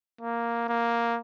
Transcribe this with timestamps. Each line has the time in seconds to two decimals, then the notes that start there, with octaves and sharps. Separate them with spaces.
0.21 A#3
0.68 A#3